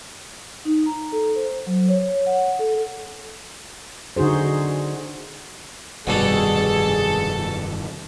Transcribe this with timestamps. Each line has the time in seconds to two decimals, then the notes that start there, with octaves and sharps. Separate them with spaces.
0.65 D#4
0.86 A#5
1.12 A4
1.36 C5
1.67 F#3
1.89 C#5
2.26 F#5
2.59 A4
4.16 D3 D#4 F#4 G#4 C5
6.07 F1 G2 B2 D#3 G3 G#4 A4